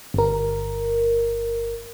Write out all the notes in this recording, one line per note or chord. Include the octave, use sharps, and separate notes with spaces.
G1 A#4